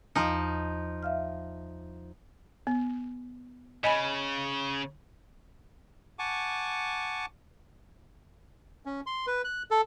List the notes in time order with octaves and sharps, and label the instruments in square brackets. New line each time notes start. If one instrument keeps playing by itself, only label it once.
[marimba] E2 F6 [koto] F3 D#4
[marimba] E5 F5 F6
[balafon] B3
[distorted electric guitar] C#3 [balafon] D#5 G#5 B5
[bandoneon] F#5 G#5 A5 C#6 D6
[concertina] C#4
C6
B4
F#6
A4